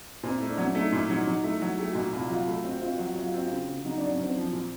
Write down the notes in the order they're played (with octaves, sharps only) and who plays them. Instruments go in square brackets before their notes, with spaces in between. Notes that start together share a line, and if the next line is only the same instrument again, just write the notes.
[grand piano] A#2 [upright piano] C4
[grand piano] A3 [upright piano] E4
[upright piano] D4
[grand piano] F#3 [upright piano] C#4
[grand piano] A3 [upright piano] D#4
[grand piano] A#2 [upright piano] E4
[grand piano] F#3 [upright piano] D#4
[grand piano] F#3 [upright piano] D#4
[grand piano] A3 [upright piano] E4
[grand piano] F#3 [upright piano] F#4
[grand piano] A3 [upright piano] G4
[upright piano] F#4
[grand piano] A#2
[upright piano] F#4
[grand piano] C2 [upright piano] F4
[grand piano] F#3 [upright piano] F4
[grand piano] A3 [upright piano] F#4
[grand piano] C4 [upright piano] F#4
[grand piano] C4 [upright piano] F4
[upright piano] F#4
[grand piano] F#3 [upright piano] F4
[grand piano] F#3 [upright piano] F#4
[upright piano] F4
[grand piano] C4 [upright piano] F#4
[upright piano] F4
[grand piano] C#3
C#3
[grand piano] F#3 [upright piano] D#4
[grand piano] F#3 [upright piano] D4
[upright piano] C#4
[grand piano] F#3 [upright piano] C4
[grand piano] F3
A#2